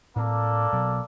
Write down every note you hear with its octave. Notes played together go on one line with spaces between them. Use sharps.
A2 A#3 C4 A4 D5
B2 F#3